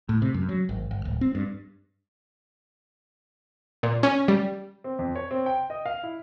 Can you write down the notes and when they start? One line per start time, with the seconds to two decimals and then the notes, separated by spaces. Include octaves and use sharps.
0.09 A2
0.22 C3
0.34 F#2
0.49 F#3
0.69 G#1
0.91 G1
1.05 D1
1.21 C4
1.35 G2
3.83 A#2
4.03 C#4
4.28 G3
4.84 C4
4.99 F2
5.16 C#5
5.31 C4
5.46 G5
5.70 D#5
5.86 F5
6.03 E4